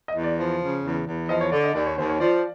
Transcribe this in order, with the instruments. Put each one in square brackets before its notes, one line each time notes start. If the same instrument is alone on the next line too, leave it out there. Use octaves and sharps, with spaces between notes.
[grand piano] D#5
[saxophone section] E2
[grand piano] D5
[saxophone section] F3
C#3
E2
E2
[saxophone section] F3 [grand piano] D#5
[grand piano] C#5
[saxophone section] D3 [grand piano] D5
[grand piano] D#5
[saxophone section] D#2 [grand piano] D5
[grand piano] C#5
[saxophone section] D#2 [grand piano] C5
[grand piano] C#5
[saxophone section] F3 [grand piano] D5